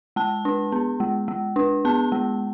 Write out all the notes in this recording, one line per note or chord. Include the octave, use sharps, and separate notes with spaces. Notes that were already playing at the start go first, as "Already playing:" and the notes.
G#3 A5
D4
B3
G#3
G#3
D4
B3 A5
G#3